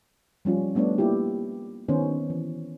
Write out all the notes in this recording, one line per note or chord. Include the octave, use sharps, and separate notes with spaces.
F3 G3 C#4 F4
G3 A3 B3 D4 C#5
A#3 E4 F4 G4
D#3 B3 C#4 D4 C5
E3